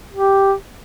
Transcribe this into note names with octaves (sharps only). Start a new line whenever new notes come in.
G4